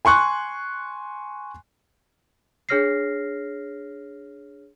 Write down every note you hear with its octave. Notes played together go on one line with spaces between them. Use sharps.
G#5 C6 C#6 F#6
D4 G#4 C#5 F6 A#6 C7